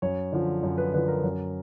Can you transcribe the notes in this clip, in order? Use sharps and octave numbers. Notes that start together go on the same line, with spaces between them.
F#2 C#5
D3 F3
F#2
B4
D3 F3 B4
A#4
F#2